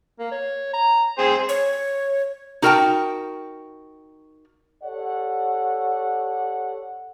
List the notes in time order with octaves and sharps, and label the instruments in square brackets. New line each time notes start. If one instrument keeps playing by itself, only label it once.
[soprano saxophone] A#3
C#5
A#5
[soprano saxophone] C4 [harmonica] G#4 C5
[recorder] C#5
[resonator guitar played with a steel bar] D#4 F#4 A#4 F#5 G5 A5
[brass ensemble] G4 A4 C#5 D5 F#5